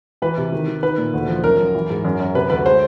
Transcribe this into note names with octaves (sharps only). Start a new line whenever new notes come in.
E3 B4
C3
D#3
D#3
D#4 B4
A#2
D2
F3
F#2 A#4
F#2
E3
G#2
F#2
F#2
C3 B4
D2 B4
G#3 C5